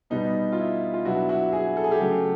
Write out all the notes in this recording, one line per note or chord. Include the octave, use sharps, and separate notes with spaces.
B2 G3 B3 D#4
F4
E4
F4
B2 F#3 B3 D4 E4 F#4
E4 F#4
F#4 G#4
A4
G#4
G4 A4
C#3 F#3 A3